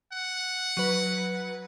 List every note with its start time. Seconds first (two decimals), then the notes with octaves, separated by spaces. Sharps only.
0.13 F#5
0.77 F#3 B4